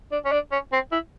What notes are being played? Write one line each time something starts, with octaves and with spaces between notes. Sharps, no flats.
D4
C#4
D4
C#4
C4
E4